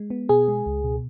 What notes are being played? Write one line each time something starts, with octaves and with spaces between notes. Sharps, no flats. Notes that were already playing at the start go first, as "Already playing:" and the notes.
Already playing: G#3
B3
B2 G#4
G#3
C#2
B2